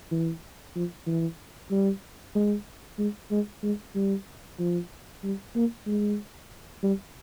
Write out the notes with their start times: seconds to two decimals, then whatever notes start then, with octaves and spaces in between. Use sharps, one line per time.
0.11 E3
0.75 F3
1.07 E3
1.71 G3
2.35 G#3
2.98 G#3
3.31 G#3
3.63 G#3
3.95 G3
4.59 F3
5.23 G3
5.56 A#3
5.87 G#3
6.83 G3